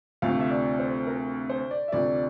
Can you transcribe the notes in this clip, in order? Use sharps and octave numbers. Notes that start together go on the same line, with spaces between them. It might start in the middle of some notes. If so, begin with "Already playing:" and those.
D2 C3 F3 A3 F5
E5
D5
C5
A#4
C5
D5
E5
D2 C3 F3 D5